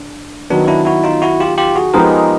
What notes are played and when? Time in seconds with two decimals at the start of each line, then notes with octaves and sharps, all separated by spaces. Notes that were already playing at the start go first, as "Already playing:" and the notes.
Already playing: D4
0.50 D#3 F#3 B3 D4
0.68 D4 E4
0.85 E4 F#4
1.03 D#4 F4
1.22 E4 F#4
1.40 F4 G4
1.58 F4 G4
1.76 F#4 G#4
1.94 F3 G#3 B3 D#4 G4 G#4 A#4